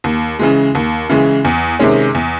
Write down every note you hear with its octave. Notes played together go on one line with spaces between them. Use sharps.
D#2
C#3 E3 G#3
D#2
C#3 E3 G#3
E2
C3 D#3 G#3 C#4
E2